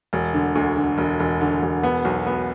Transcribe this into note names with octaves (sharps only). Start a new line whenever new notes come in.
E1
D3
D2
D3
E1
E1
D3
E1
B3
B1
B3